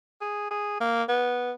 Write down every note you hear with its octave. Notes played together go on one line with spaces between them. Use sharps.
G#4
G#4
A#3
B3